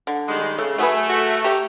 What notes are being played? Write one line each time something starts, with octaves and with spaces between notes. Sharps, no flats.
D3
D#3 G3 G#3
C#3 A3
F#3 A3 G#4 B4
F#4
G4 C#5 A#5